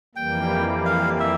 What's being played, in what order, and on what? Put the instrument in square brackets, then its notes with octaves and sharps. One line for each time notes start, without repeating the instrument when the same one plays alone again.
[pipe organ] F2 E3 G3 A#3 [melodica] G5
[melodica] F5
E5